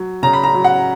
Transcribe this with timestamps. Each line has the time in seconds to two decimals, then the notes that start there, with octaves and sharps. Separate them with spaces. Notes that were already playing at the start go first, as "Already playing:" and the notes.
Already playing: F#3
0.23 C#3 A#5
0.33 B5
0.43 A#5
0.54 F#3
0.64 F#5